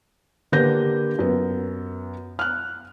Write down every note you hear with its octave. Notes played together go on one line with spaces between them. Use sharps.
D3 A#3 G4 B4 G6 A#6
F#2 B3
F6 F#6